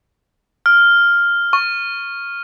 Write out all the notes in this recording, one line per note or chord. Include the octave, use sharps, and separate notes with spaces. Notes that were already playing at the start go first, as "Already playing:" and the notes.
F6
C#6